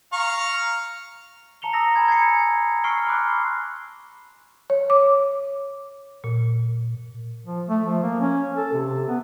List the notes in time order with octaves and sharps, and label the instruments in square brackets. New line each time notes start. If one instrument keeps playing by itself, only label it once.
[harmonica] F5 A#5 C#6
[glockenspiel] A5 A#5 C#7 F7 G7
A#5 D#6 E6 A#6
G#5 A#5 B5 G#6
G#6 A#6 C7 C#7
C#6 E6 F6 C7 D7 G7
B5 C6 D6 F#6
[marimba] C#5
D6
A#2
[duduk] F3
A3
F3
A#3
C#4
A4
C3
B3